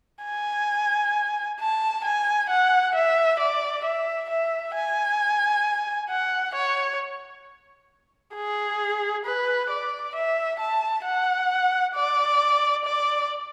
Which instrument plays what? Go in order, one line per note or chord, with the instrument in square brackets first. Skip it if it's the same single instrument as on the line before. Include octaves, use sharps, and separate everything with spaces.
[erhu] G#5
A5
G#5
F#5
E5
D5
E5
E5
G#5
F#5
C#5
G#4
B4
D5
E5
A5
F#5
D5
D5